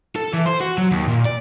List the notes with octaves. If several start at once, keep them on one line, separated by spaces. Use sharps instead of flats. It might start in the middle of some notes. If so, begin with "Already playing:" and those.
A4
E3
C5
F#4
F#3
D#2
A#2
D5